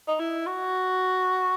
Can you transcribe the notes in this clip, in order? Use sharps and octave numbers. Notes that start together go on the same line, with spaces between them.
D#4
E4
F#4